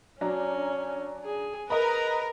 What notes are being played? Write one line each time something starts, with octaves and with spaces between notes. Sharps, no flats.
F#3 C#4 D4 A#5
G#4
A#4 B4 D#5 A#5 B5